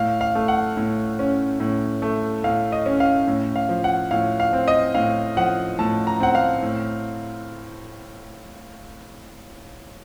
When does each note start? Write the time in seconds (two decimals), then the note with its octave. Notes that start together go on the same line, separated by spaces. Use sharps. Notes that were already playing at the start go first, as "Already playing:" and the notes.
Already playing: A2 F5
0.21 F5
0.35 A3
0.48 F#5
0.77 A2
1.19 C#4
1.60 A2
2.02 A3
2.44 A2 F5
2.72 D#5
2.86 C#4
3.00 F5
3.28 A2
3.56 F5
3.69 F3
3.84 F#5
4.11 A2 F5
4.40 F5
4.53 C4
4.68 D#5
4.95 A2 F5
5.37 F3 F#5
5.79 A2 A5
6.07 A#5
6.20 C4 F#5
6.35 F5
6.63 A2